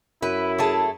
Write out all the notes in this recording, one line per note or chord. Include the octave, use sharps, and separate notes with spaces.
F#2 E4 B4
A3 G#4 A5